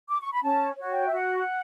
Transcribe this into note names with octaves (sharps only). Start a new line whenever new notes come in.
D6
C#6
B5
C#4 A5
F#4 C#5
G5
E5
F#4 F#5